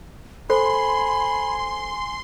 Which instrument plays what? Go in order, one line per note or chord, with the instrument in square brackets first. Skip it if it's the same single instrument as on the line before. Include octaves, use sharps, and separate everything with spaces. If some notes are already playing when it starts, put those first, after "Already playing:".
[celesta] A4 C5 [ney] G#5 [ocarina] B5 [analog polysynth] C6